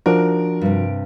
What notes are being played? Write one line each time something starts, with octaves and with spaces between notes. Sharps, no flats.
F3 D4 D#4 F#4 A#4
G2 C3